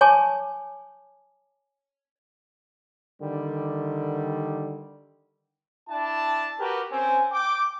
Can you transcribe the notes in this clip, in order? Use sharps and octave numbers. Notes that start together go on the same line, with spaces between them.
C#5 G#5 A5 C#6 D6
D3 D#3 G3
D4 E4 A5
F#4 G4 A#4 B4
C4 C#4 G#5
G5 D6